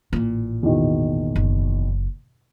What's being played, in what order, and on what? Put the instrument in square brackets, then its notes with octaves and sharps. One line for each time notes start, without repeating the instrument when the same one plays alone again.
[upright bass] A1 A#2
[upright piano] E2 B2 D#3
[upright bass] F#1